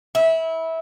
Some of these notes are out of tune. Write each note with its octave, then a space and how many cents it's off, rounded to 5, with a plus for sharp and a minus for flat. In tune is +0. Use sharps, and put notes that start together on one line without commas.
E4 -20